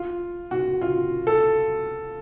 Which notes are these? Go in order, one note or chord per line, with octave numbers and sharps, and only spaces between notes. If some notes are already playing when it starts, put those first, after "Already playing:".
Already playing: F4
F#4
F4
A4